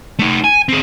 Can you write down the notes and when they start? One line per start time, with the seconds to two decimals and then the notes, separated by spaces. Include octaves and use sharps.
0.19 A3 D#4
0.44 G#5
0.69 C4 G#4